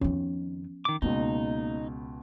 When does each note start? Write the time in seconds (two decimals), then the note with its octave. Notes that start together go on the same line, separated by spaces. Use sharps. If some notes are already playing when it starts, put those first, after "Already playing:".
0.01 F2 D#3 F3 B3 C#4
0.85 D#3 D6
1.02 C#2 B2 A#3 D#4